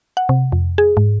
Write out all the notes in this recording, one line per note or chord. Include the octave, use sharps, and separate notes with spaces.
F#5
C3
F2
G#4
G#2